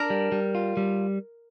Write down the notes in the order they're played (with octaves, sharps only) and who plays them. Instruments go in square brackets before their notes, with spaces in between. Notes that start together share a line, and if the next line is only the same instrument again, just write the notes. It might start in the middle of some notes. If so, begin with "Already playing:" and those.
Already playing: [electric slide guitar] D4 [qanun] A#4
[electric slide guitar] G3
G3
F4
G3